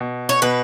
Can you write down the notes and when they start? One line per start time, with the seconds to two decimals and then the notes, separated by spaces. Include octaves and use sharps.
0.01 B2
0.29 C#5
0.42 B2 B4